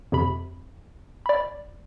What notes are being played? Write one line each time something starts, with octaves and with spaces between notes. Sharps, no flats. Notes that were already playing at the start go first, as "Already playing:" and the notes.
F2 C3 B5
D5 B5